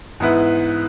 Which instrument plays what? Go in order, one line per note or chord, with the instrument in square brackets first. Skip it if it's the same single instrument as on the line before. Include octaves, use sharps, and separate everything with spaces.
[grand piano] G#2 E3 B3 E4 B4